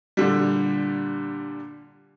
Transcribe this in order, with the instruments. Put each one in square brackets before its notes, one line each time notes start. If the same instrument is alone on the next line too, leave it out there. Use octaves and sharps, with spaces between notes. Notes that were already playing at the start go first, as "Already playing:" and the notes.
[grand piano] A#2 D3 G3